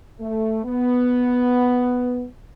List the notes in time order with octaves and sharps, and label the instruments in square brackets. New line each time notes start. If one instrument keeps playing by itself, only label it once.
[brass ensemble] A3
B3